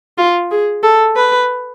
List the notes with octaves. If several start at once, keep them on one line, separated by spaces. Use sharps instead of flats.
F4
G#4
A4
B4